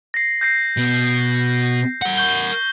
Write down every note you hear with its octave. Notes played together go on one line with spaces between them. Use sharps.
A#6 C7
G6 A#6 C7
B2
A#4 F#5
C#6 G6 G7